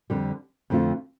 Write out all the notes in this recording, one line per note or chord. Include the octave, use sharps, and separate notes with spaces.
F2 D3 G3
F2 D3 A3 C4 F4